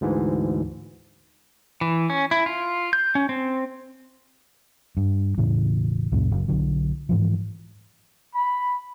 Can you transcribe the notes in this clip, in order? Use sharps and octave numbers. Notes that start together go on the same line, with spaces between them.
D2 G#2 E3
E3
C#4
E4
F4
G6
C#4
C4
G2
E1 A2 C#3 E3
C#2 F#2 A#2 C#3
F#1
B1 D3 F#3
G#2 E3 F3
B5